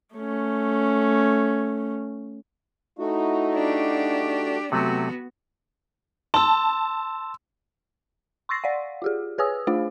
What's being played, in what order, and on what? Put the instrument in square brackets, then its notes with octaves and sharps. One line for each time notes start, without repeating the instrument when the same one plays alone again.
[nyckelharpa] A3 C#4
[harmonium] A3 F#4 [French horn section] D#4 E4
[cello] D4 G4
[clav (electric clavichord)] C3 F#3 A3 [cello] B3 F#4
[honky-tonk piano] A5 [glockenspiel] C6 E6
[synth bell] C6 C#6 E6 A6 A#6 C7
D5 F5 F#5
F4 G4 G#4
G#4 B4 C#5 G#5 D#6 E6
A3 D4 F4 G#4 C5 F5